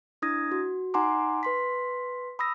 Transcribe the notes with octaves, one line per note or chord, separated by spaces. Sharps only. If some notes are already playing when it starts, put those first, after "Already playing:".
D4 E4 D#6 G#6 A#6
F#4
D#4 F#5 G#5 A#5 C6 D6
B4 C6 B6
B5 D#6 E6 A#6